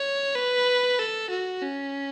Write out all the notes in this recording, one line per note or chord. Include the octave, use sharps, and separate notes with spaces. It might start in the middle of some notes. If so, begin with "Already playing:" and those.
Already playing: C#5
B4
A4
F#4
C#4